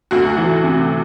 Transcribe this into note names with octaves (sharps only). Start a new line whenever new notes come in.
D2 F#4
E3
C3